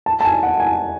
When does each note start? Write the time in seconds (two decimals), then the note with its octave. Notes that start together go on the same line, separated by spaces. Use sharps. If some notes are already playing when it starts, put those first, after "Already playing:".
0.06 A5
0.21 A5
0.25 G#5
0.43 F#5
0.60 G#5